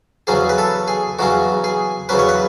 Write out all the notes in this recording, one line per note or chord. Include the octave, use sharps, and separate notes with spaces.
E2 C#3 F#3 C#4 G#4
B4
A4
G#4
E2 C#3 F#3 C#4 F#4
G#4
E2 C#3 F#3 C#4 B4
C#5
B4